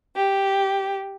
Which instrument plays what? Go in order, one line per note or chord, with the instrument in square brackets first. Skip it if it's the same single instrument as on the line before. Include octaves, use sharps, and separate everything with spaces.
[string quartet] G4